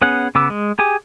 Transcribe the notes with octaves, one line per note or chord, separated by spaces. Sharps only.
B3 C#4 G#4 F#5
C#3 B3 D6 E6
G#3
G4 G#4 G#5 D6